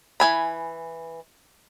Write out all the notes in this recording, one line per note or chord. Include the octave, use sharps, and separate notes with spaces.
E3 G#5 B5